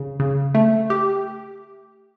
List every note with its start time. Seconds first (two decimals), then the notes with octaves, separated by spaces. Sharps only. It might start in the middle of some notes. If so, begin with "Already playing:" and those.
Already playing: C#3
0.20 C#3
0.55 A3
0.90 G4